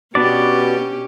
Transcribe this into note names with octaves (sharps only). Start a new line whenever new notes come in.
B2 B3 C#4 D4 F#4 G4 D5